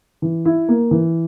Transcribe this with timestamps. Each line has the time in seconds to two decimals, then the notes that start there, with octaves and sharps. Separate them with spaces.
0.22 E3
0.45 E4
0.69 A#3
0.91 E3